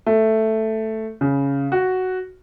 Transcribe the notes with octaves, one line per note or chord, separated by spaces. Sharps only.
A3
C#3
F#4